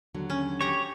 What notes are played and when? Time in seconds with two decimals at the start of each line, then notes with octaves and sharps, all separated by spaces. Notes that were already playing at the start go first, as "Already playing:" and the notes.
0.14 D#2 D3 F#3
0.30 C#4
0.61 G4 C#5 A#5